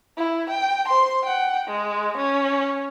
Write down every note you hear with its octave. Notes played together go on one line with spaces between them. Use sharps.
E4
G5
C5 C6
F#5 G5
G#3
C#4